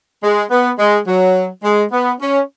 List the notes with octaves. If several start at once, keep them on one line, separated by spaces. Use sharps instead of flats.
G#3
B3
G#3
F#3
G#3
B3
C#4